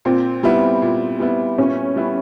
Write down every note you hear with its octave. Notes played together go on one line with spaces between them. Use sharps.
A#2 C4
G3 B3 E4
A#2
G3 B3 E4
A#2 C#4
G3 B3 E4